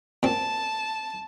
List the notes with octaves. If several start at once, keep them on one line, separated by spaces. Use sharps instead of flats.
A#2 C4 A5